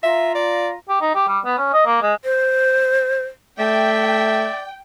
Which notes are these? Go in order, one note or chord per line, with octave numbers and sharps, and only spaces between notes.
F4 E5 A#5
D5
G4
D#4
G4
G3
B3
C#4
D#5
A#3
G#3
C5
A3 D5 E5 G5